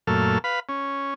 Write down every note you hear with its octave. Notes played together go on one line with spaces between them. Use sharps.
F#2 A#2 A3 A4 F6
B4 F5 B5
C#4